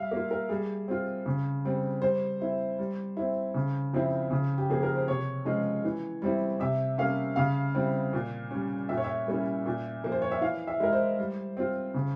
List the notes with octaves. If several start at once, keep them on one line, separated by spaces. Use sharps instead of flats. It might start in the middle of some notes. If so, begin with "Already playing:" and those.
Already playing: G3 E5 F5
A#3
F4
A#4
G3 G#4
C4 F4
C#3
G3 C4
G3 C5
C4 E4
G3
C4 E4
C#3
F3 C4 E4
C#3
G4
F3 A#3 G#4
A#4
C5
C3 C#5
F3 G#3 C#4 F4
E3
G3 C4 E4
C3 E5
G3 A#3 C#4 F5
C#3 F5
G3 C4 E4
A#2
G3 C#4
A#2 E5
C#5
E5
G3 A#3 C#4 E4
A#2
F3 A#3
C5
C#5
E5
E3 F5
E5
G#3 E4 A#4
C5
G3
C4 F4
C#3